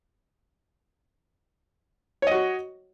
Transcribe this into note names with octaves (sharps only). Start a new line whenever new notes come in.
F#4 C#5 D#5